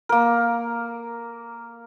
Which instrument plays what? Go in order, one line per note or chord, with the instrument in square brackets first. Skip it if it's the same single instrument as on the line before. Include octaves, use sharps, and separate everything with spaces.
[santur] A#3 A#4